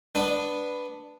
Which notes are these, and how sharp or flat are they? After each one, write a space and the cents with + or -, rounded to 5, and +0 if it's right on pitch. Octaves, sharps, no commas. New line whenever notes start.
B3 +0 D4 +0 B4 +10